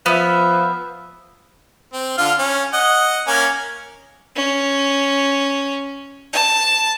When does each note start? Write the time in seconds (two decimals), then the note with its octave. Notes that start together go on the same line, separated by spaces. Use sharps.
0.06 F3 B3 E5
1.93 C4
2.18 D3 F4 F6
2.39 C#4
2.73 D#5 F#5
3.27 A#3 C#4 G#5
4.36 C#4
6.33 A5